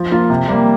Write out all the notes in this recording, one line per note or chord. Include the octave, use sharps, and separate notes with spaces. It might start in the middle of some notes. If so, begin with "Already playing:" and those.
Already playing: F3
A#3 F4
C3
G3 A#3